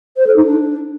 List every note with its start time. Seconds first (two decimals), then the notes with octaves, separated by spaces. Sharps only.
0.17 C5
0.27 A4
0.36 D#4
0.46 D4